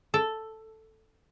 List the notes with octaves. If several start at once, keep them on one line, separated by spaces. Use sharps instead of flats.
A4